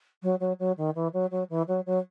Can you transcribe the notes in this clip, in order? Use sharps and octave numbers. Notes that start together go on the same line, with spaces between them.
F#3
F#3
F#3
D#3
E3
F#3
F#3
E3
F#3
F#3